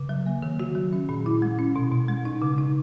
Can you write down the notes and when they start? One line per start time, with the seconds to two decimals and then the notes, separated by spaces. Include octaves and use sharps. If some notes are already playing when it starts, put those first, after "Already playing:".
Already playing: C#3
0.09 F#3
0.26 A#3
0.42 D#3
0.60 F#4
0.75 F#3
0.93 C#4
1.09 A#2
1.26 E4
1.42 G#3
1.59 C#4
1.76 B2
1.92 B2
2.08 G#3
2.25 D#4
2.42 C#3
2.58 D#4